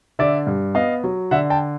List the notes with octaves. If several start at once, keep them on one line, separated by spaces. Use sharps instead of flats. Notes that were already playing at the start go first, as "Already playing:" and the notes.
D3 D5 E5
G2
B3 D#5 F5
F#3
D3 E5 F#5
G5 A5